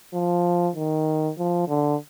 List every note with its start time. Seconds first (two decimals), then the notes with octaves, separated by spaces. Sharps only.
0.14 F3
0.76 D#3
1.38 F3
1.68 D3